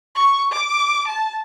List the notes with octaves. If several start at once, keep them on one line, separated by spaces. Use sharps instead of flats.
C#6
D6
A5